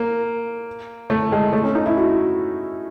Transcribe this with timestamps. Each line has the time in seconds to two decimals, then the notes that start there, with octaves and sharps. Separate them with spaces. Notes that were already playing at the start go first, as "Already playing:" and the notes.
Already playing: A#3
1.10 A3
1.32 G#3
1.53 A3
1.63 C#4
1.75 D#4
1.86 E4
1.97 F#4